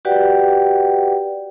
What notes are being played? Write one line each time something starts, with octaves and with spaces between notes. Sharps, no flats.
F#4 G4 B4 D5 F#5 G5